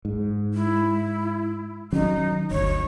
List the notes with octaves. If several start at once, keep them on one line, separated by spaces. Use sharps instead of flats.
G#2
E4
D#3 F#3 C#4 D#4
G1 D2 C#5